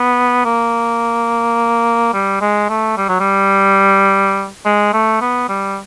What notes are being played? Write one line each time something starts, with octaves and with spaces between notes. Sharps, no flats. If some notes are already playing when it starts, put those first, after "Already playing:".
Already playing: B3
A#3
G3
G#3
A3
G3
F#3
G3
G#3
A3
B3
G3